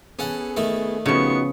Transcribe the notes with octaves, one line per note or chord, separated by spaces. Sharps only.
B3 C#4 G#4 A4 F#5
D#3 A3 A4
C#3 F3 B3 D#4 F#4 C#6